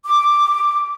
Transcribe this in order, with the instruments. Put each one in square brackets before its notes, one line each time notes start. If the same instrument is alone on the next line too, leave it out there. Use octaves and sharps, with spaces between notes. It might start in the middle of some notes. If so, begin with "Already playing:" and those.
[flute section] D6